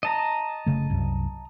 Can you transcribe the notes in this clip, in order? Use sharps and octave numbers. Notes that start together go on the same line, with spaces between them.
D#5 A5 A#5
F#1 C#3 A3
C2 F#2